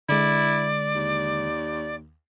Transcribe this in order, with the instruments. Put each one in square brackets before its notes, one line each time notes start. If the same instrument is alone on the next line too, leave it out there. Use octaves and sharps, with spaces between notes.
[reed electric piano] D3 G#3 [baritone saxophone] E4 [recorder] D5
[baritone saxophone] D#2